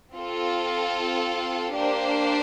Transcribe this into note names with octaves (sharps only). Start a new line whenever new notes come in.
C4 F4 A4
A#3 D4 G4 C5